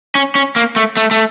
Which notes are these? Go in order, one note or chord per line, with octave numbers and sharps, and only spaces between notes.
C#4
C#4
A#3
A3
A3
A3